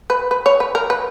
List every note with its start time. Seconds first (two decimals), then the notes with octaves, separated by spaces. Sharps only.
0.10 B4
0.31 B4
0.46 C#5
0.60 B4
0.75 A#4
0.90 B4